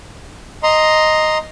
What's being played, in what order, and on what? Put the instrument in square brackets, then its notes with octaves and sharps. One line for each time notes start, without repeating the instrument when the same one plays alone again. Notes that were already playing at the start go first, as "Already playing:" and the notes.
[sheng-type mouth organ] D#5 A#5 C6